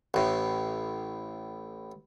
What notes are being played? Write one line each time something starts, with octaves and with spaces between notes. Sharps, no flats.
A1 A2